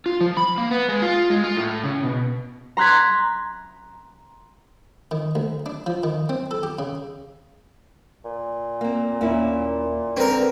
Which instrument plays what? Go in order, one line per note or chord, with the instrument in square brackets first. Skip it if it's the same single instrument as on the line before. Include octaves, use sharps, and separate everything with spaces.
[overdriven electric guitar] F4
F3
B5
A#3
B3
G#3
F4
G#3
F4
A2
C#3
B2
[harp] A#5 C6 F#6 G#6 B6
[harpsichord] D#3
D2
D4
F3
D#3
C4
A4
G4
C#3
[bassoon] A#2
[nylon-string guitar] A#3 C4
[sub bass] D#2 [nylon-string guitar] A#3 C#4 E4
[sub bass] D#1 [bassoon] D3 [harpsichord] C4 A#4 [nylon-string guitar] B4